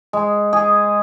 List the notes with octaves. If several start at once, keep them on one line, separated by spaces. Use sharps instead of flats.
G#3
G#4